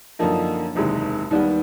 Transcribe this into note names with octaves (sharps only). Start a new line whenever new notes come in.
F#2 D3 F3 A#3 D#4
F#1 E2 C3 D#3 G#3
D#2 D#3 G3 B3